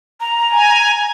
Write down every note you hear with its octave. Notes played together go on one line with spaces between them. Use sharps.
A#5
G#5